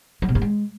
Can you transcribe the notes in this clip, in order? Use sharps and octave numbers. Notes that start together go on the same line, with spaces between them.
F#3
B2
G2
G#3